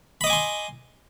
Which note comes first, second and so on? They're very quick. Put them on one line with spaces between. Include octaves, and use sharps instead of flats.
B5 D#5 D6 G#5 C6